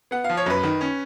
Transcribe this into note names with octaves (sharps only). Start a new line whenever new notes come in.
B3 F#5
F5
F3
C#5
F#2 B4
D#3
C#4